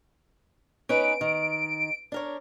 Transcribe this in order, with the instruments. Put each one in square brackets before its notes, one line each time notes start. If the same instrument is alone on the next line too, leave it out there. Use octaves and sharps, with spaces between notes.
[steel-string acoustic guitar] C#4 D#4 B4 [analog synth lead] D7
[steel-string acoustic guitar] D#3
D4 A#4 C#5